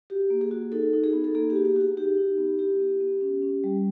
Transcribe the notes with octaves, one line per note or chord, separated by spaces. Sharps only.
F#4 G4
A#3
G#4
F#4
D#4 A4
D#4
G#4
B3
A4
A#3 G#4
G4
F#4
G4
F#4 G#4
D#4 G4
D#4
B3
E4 G4
B3
B3
C#4
C#4
G3